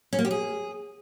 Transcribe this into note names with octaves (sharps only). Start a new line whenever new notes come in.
C#4
A#3
G4
G#4